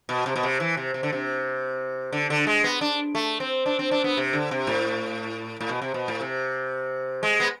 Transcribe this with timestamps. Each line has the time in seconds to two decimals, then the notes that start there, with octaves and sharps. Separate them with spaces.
0.09 B2
0.26 C3
0.36 B2
0.43 C3
0.60 E3
0.77 C3
0.94 C3
1.03 D3
1.12 C3
2.12 D3
2.30 D3
2.47 G#3
2.64 B3
2.81 D4
3.15 A3
3.40 C4
3.66 D4
3.79 C4
3.91 D4
4.04 B3
4.17 C3
4.33 D3
4.51 C3
4.67 A2
5.61 A2
5.69 B2
5.82 C3
5.94 B2
6.08 A2
6.21 C3
7.23 G#3
7.40 B3